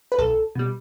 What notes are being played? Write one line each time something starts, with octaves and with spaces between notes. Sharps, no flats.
B4
B1 A4
B2 G3